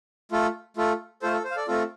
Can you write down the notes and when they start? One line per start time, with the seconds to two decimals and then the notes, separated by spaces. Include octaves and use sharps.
0.32 A3 F4 A4
0.77 A3 F4 A4
1.22 A3 F4 A4 C5
1.32 A4
1.44 C5
1.51 F5
1.56 A4 D5
1.67 A3 C4 F4 A4